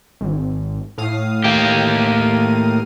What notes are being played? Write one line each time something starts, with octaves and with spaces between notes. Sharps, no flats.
G#1
A2 F5 D#6
A#3 G4